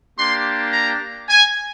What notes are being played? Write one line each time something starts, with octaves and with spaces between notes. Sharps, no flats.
A#3 D4 G4 C6
A#5
G#5